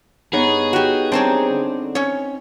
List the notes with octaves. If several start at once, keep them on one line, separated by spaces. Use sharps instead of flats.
G2 B3 D#4 G#4 C#5
F#4 G4
G3 C4 D4 C5 C#5 G#5 A#5
D3
C#4 C#5